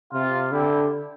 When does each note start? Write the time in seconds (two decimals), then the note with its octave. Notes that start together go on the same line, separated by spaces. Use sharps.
0.13 C3 F4
0.51 D3 E4 G4